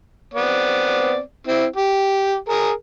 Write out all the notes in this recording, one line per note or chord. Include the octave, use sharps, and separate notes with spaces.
B3 C4 D5
C4 E4
G4
G#4 A#4